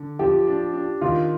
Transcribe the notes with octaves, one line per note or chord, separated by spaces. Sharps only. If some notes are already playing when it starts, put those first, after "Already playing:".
Already playing: D3
F3 G4
D4
D4
D#3 F4